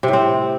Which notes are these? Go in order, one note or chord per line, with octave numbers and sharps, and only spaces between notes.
C3
A2
C4